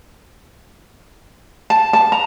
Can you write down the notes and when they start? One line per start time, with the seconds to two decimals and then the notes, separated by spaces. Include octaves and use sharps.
1.70 A5
1.93 A5
2.12 A#5